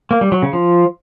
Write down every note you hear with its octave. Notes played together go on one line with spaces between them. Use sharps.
A#3
G3
F#3
C#3
F3